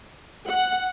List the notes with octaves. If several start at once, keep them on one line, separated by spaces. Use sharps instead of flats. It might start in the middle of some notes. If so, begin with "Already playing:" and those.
F#5